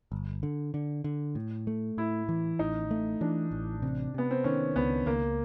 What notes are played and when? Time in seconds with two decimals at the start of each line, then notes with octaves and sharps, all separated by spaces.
0.12 G1
0.43 D3
0.74 D3
1.04 D3
1.35 A2
1.67 A3
1.97 A2 E4
2.29 E3
2.59 A1 D#4
2.91 A3
3.21 E3 D4
3.51 A1
3.82 C3
4.14 C3 B3
4.31 C4
4.44 D#3 C#4
4.76 C#2 B3
5.06 C#2 A#3